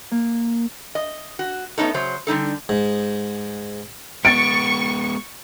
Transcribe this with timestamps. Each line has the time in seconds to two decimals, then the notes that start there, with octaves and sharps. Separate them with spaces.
0.11 A#3
0.95 D#5
1.39 F#4
1.78 A3 B3 C#4 D#4 A4
1.94 C#3 F#3 C5
2.27 D3 G3 D#4 A4
2.69 G#2
4.25 G#3 B3 C#6 A6 D7